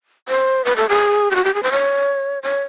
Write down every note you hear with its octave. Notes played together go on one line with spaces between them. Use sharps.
C5
B4
A4
G#4
G4
F#4
G4
G#4
C5
C#5
C#5